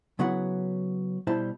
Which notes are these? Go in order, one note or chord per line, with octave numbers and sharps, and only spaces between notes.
C#3 F#3 B3 E4 C#5 F#5
B2 G3 E4 C5 A5